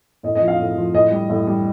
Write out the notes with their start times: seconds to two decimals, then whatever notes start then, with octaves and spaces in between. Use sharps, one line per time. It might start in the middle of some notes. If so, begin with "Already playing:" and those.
0.23 A2 D#5
0.35 D#5
0.41 F3
0.48 F5
0.59 A2
0.77 F3
0.94 A2 D#5
1.11 G3
1.29 A2
1.47 G3